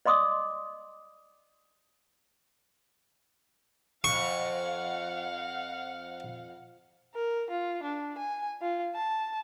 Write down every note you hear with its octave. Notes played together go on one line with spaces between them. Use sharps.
D5 D#5 C6 D6 D#6
F2 F5 F#5 C#6
A#4
F4
D4
G#5
F4
A5